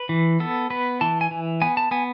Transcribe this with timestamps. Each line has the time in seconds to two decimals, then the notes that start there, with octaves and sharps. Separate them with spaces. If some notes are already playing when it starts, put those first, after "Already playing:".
Already playing: B4
0.09 E3
0.40 B3 A4
0.70 B3 B4
1.01 E3 A5
1.21 G#5
1.31 E3
1.62 B3 G#5
1.77 A5
1.91 B3 G#5